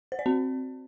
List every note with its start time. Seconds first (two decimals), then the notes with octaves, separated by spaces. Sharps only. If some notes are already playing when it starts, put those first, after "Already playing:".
0.12 C5
0.19 D5
0.26 C4